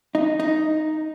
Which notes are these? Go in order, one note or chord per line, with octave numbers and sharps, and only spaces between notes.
D#4
D#4